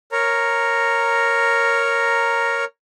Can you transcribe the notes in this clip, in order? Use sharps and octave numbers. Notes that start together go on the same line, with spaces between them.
A#4 C#5 A#5